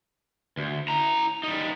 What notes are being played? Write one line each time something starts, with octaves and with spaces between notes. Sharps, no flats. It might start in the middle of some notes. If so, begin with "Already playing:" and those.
D2
E4 A#5
G3 D#4